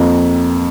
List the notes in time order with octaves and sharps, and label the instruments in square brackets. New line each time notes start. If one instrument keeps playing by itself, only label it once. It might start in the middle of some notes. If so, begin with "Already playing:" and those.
Already playing: [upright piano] F2 A#3